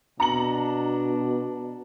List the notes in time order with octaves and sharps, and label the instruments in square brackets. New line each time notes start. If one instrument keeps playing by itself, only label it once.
[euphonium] B2 [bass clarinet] D4 [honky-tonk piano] A#5 C#7 F#7